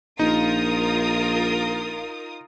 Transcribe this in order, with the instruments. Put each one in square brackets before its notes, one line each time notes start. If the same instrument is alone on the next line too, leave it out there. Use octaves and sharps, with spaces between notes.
[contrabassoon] A#1 [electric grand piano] D#4 [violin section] F4 A#4 D#6